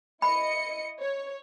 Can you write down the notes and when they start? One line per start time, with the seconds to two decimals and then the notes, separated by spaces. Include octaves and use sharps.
0.22 E4 D#5 B5 C#7
1.00 C#5